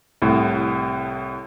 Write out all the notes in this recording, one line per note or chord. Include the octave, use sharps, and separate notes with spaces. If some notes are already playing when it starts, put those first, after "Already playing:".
C2 A2